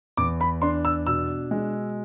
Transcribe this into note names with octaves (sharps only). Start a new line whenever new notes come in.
E2 D6
B5
D4 C6
E6
B2 E6
G#3